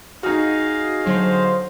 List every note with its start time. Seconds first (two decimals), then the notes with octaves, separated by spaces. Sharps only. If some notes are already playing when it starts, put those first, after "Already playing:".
0.23 D#4 F#4 G#4 D#5 F5 F6
1.06 D3 F#3 C5